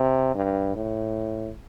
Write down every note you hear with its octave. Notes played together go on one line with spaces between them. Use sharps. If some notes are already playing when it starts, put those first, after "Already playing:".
Already playing: C3
G2
A2